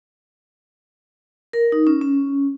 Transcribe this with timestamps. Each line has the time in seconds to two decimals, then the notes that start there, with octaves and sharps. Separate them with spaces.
1.53 A#4
1.72 D#4
1.87 C#4
2.01 C#4